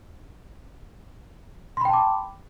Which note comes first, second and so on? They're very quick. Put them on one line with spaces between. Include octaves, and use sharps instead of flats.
C6 B5 G5 A5 D6